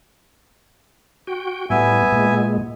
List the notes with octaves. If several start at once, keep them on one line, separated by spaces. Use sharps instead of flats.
F#4 G5
A2 G3 B3 E5 G#5
A#2 G#3